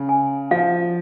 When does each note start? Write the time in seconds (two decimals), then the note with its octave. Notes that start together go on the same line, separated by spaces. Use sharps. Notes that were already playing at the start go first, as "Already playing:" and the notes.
Already playing: C#3
0.09 G#5
0.51 F3 F5